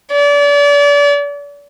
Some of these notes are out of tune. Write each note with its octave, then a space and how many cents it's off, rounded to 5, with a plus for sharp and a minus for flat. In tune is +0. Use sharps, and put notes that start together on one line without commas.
D5 -35